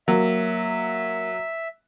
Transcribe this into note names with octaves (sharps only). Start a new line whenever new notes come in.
F#3 A#3 E5